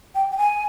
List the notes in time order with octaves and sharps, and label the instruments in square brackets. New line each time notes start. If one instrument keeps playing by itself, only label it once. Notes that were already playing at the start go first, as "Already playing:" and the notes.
[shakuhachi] G5
G5
G#5